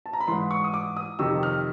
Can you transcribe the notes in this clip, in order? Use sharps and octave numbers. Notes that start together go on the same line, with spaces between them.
A5
A#5
B5
G#2 E3 C6
C#6
D#6
D6
D#6
F2 C3 D#3 E6
F6